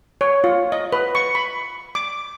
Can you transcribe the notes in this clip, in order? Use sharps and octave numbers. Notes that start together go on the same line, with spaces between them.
C#5
F4
D#5
B4
C#6
B5
D6